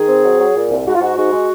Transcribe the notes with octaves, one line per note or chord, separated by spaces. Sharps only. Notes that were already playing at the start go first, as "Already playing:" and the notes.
Already playing: D#3 G#4
C4
F#3
F#3
A#2
C2
G#2 F#4
F4
G#2 F#4
G#2 F#4
G#3